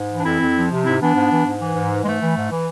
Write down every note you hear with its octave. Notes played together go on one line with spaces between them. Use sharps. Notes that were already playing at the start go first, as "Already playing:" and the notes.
Already playing: G#2
E3
D4
F2 C4 E4
F2
F3
C3
G#2 C4 E4
E3 B3 D4
G#2
E3
G#2
E3
G#2
E3
G#3
G#2 A3
E3
G#2
E3